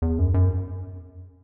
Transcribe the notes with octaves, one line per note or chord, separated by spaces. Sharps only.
E2
F#2
F#2